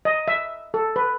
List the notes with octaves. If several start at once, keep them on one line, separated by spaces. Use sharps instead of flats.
D#5
E5
A4
B4